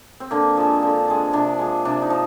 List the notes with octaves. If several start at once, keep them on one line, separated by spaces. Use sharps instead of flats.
C4
D3 A#3
F3 G#3
D3
F3 G#3
C3 D4
F3 G#3
C3 D4
D#4
F3